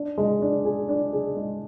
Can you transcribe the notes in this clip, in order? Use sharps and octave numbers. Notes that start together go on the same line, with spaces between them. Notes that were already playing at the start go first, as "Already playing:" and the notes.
Already playing: D4
G#3
D4
G#4
D4
G#4
G#3